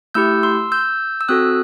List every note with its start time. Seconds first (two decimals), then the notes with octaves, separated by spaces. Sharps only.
0.14 A3 E4 G4 E6 G6
0.43 C6 E6
0.72 E6 G6
1.21 E6
1.28 C4 F#4 A4 D#6 F#6